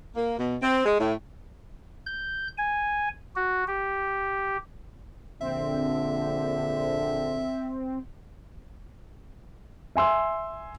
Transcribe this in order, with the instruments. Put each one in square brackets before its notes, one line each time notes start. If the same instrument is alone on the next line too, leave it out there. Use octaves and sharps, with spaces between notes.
[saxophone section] A#3
B2
C4
G#3
A2
[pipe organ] G6
G#5
F#4
G4
[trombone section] A#1 D3 [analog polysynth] C4 [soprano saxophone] E5
[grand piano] E5 G#5 C6 E6